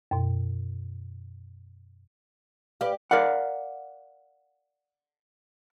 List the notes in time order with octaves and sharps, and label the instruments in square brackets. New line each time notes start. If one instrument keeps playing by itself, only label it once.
[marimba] F#2 B2
[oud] G4 D5 [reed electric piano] B4 F5
[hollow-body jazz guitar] A#4 D5 F5 F#5